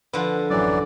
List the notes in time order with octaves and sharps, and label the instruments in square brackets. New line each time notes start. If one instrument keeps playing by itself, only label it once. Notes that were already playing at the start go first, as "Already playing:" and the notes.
[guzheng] D3 F3 [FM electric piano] B4
[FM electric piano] A1 F#2 [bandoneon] E3 F#3 D5